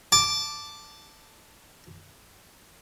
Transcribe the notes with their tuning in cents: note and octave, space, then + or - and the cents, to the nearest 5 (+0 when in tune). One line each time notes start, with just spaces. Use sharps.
A5 +0 D6 +0